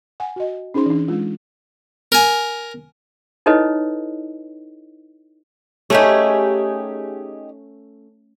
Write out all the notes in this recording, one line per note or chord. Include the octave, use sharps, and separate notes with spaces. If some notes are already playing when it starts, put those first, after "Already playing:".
F#5 G#5
F#4 D#5
C#4 D#4 G#4 C5 C6
E3 D4
G#3 F4
A#4 G#5
D#4 E4 A4 B4 C#5 D#5
A3 C#4 D#4 G4 G#4